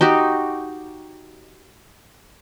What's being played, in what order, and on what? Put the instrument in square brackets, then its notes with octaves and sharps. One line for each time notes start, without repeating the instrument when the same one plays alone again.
[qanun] D#4 F#4 G4